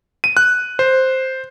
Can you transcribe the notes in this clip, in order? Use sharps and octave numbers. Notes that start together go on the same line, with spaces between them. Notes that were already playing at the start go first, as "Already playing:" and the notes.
D#7
F#6
C5